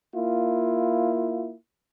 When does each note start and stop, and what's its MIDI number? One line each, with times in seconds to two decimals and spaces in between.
0.15 1.54 58
0.15 1.54 64
0.15 1.54 65